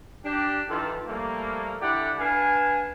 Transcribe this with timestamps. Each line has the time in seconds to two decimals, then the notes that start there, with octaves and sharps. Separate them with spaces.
0.24 D4 G4
0.70 D#3 E3 F4 G4 A4
1.06 F3 G3 A3 A#3
1.81 D3 E4 G4 D5 F#5
2.19 D4 B4 F5 G#5